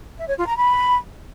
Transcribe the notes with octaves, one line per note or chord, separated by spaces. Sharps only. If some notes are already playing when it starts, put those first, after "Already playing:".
E5
C#5
F4
A#5
B5